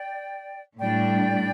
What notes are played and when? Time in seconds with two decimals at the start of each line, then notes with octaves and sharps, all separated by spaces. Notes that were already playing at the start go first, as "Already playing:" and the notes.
Already playing: D5 G5
0.78 A2 G3 D4 D5 G5